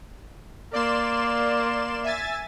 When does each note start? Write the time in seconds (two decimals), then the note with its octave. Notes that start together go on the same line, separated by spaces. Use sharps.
0.73 A#3 D5 C6 E7
2.04 E5 G#5 A6